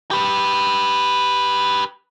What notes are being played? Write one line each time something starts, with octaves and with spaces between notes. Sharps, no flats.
G4 B4